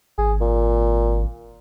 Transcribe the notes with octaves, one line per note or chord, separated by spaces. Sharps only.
G#1 G#4
A#2